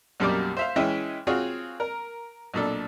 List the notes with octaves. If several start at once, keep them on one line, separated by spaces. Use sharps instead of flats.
B1 F#2 G3 A#3 D5 D6
C5 E5 F5
E3 G#3 C#4 E5 G5
C4 F4 F#4 G#4 C#5
A#4
B1 A#2 D4 A4